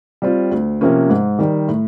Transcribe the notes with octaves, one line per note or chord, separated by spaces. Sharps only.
G3 C4 F4
D2
C3 F3 A#3 C#4
G#2
D#3 G3
A2